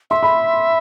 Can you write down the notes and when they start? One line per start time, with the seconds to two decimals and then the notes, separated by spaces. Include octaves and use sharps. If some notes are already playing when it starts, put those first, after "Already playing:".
0.10 E5 C6
0.23 B5